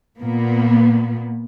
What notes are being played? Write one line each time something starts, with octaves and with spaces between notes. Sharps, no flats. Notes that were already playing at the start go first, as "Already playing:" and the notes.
A#2 A#3 B3